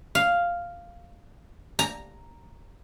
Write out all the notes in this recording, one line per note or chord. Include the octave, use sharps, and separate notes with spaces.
F5
A#5